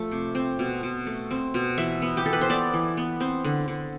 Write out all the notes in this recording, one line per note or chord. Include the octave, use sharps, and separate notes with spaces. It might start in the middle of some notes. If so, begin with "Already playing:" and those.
Already playing: F3 A3
C3
C4
B2
B2
A3
C4
B2
E3 E5
B3
G4
E3 A4
B4
C5
B3 D5
E3
B3
C4
D3
D3